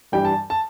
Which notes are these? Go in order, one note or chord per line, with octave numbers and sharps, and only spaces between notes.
G2 E3 G3 G5
A5
A5